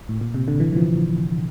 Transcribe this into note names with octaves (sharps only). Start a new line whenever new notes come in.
A2
A#2
C3
D3
E3
E3
F3